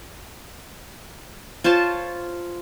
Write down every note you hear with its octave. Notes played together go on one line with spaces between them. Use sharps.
F4 C5 C#5 A5